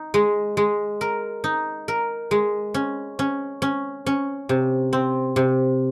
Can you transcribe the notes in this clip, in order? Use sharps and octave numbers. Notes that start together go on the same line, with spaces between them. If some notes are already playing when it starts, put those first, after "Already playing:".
Already playing: D#4
G#3
G#3
A#4
D#4
A#4
G#3
C#4
C#4
C#4
C#4
C3
C4
C3